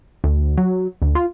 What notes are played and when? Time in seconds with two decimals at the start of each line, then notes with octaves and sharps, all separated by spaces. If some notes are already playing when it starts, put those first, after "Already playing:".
0.24 D2
0.58 F#3
1.02 D2
1.15 F4